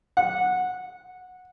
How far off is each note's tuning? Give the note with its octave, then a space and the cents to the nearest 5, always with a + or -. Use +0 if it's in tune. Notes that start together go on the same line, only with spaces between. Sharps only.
F#5 -15